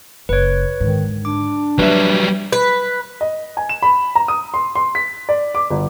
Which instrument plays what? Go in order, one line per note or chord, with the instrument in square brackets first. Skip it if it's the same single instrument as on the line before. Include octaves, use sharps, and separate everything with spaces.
[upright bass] F#1 [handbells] B4 C#5
[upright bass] G#2 D3 [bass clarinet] D#3
[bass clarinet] D4 [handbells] D6
[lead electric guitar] F#3 G3 [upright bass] A#3 [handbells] B4 E5
[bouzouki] B4
[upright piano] D#5
G#5
E7
B5
A#5
D#6
C6
C6
B6
D5
D6
G1